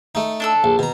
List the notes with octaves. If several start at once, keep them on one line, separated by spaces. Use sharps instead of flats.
A3 D#4
D4 A4 E6
A#1
B2 A#5